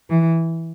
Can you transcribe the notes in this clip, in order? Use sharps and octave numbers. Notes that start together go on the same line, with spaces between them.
E3